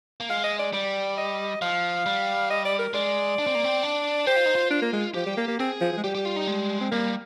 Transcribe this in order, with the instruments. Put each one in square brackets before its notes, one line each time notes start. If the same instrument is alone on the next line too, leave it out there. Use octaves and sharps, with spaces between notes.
[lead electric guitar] A#3
[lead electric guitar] G#3 [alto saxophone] F5
[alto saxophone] D#5
D5
[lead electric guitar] G3 [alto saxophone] D5
[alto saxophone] D#5
[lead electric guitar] F3 [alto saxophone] F5
[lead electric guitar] G3
[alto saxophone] D#5
D5
A#4
[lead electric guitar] G#3 [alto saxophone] D5
[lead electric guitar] D4
C4
A#3
C4
D4
[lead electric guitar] G4 [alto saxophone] C5
[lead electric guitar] F4
D#4
F4
[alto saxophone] D4
A#3
G#3
[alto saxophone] F3 [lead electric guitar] G4
[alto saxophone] G3
A#3
A#3
[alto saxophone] C4 [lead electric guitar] G#4
[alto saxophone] F3
F3
G#3
[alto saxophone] G3 [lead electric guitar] G4
[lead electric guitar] G4
F4
D#4
G#3
[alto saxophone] C4
[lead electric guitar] G3 [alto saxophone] A#3